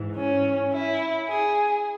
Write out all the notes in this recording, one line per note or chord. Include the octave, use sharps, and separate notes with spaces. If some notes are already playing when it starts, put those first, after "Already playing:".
Already playing: G#2 E3
C#4
E4
G#4